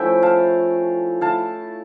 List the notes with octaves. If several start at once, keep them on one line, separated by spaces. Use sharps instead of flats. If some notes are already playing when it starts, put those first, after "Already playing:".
Already playing: F3 A3 C#4 E4 E5 G5
F5 A5
A3 E4 F5 A5